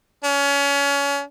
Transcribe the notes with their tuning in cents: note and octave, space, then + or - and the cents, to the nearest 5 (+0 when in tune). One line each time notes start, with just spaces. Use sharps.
C#4 +30